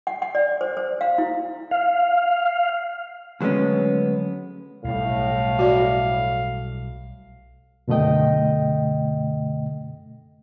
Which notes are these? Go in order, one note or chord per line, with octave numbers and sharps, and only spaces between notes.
F#5
F#5
D5
C5
C5
F5
E4
F5
D2 F#3 G#3 B3 C#4
B1 A2 G3 F5
F#4 D5
F#2 B2 D3 A3 D#5 G5